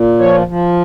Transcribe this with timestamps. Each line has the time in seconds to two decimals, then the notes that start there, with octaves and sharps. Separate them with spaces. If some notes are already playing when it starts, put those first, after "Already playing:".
Already playing: A#2
0.19 F3 C#5
0.47 F3